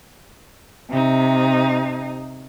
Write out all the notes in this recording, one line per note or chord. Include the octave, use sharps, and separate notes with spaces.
C3 D#4